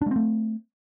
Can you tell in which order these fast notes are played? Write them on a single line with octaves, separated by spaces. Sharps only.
D4 G#3 C4 A3